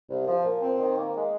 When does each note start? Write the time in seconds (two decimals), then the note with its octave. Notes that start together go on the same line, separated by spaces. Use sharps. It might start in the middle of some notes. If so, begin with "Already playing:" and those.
0.10 C2
0.28 F3
0.45 A#2
0.62 C4
0.79 D#3
0.97 A#3
1.15 G#3